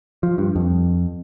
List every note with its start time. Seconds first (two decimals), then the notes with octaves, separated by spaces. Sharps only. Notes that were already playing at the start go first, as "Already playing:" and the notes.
0.23 F3
0.38 G2
0.56 F2